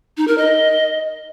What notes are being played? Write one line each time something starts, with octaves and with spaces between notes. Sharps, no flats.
D#4
A#4
D#5